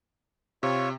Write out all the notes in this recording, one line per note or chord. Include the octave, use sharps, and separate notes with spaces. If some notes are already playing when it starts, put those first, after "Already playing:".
C3 F4 C#5 C#6